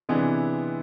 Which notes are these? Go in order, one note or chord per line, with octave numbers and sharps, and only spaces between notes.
C3 E3 G#3 B3 D4